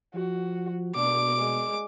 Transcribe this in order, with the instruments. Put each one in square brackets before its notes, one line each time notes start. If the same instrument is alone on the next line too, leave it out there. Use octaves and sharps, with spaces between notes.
[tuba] F3 [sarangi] F#4
[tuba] B2 [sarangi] D4 [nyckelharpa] D6
[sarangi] G#3